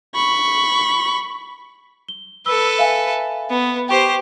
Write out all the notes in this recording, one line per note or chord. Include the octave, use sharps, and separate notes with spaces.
B5 C#6
G7
A4 B4 E6 G7
E5 F5 G#5
B3
G4 C5 G5 C#6